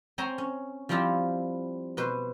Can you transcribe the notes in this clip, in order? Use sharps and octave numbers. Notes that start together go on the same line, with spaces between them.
C4 C5 C#5 G#5 A#5 C6
C#4
F3 G3 C4 E4 F4 G4
B2 B4 C5